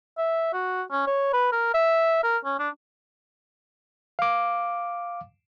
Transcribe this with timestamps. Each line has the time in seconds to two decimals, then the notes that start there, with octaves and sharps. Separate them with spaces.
0.18 E5
0.54 F#4
0.92 C#4
1.07 C#5
1.33 B4
1.52 A#4
1.74 E5
2.24 A#4
2.45 C#4
2.59 D4
4.19 F5 D6